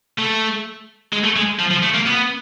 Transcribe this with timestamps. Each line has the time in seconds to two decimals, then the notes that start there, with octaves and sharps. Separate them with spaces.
0.18 A3
1.13 G#3
1.24 A3
1.36 G#3
1.59 F3
1.71 F3
1.83 A3
1.94 A#3
2.06 B3